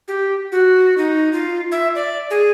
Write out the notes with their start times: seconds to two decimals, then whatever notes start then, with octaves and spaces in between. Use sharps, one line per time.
0.08 G4
0.52 F#4
0.98 D#4
1.33 F4
1.72 E5
1.95 D5
2.30 G#4